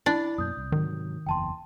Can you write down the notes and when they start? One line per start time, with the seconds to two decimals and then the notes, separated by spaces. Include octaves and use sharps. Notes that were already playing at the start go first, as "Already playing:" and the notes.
0.06 D4 E4 B5
0.38 F#2 B2 A#3 D#6 G6
0.57 C2
0.72 G#2 C3 D#3 F#3
1.27 F#1 E2 E3 G5 A5 C6